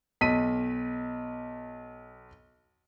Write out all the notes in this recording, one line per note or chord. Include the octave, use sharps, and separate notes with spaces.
B1 B6 D#7